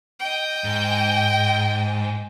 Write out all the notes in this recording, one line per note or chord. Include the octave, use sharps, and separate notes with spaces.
D#5 G5
G#2